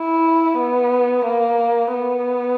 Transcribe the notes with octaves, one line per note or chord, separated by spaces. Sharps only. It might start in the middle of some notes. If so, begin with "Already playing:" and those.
Already playing: E4
B3
A#3
B3